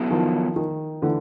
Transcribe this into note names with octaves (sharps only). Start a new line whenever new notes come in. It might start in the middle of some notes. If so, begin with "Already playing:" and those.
Already playing: F#3 B3 E4 A4
D#3 F3
D#3
D3 E3